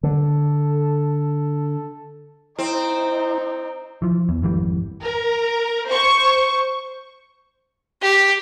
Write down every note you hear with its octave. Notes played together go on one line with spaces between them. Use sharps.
D3 A4
C4 D#4 E4
E3 F3
E2
G#1 F2 E3 G3
A#4
C5 C#6
G4